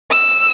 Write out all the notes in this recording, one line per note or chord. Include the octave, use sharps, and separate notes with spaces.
E6